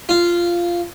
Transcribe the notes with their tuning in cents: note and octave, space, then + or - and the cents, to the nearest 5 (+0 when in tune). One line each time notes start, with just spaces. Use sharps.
F4 -10